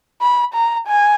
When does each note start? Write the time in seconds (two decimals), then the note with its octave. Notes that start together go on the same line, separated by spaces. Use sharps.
0.21 B5
0.54 A#5
0.87 G#5